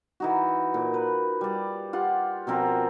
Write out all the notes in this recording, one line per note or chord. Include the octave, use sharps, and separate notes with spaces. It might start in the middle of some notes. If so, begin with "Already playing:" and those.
E3 D#4 F#4
A#2
B4
G3 D5
F4 G4 F#5
B2 F3 C4 A#4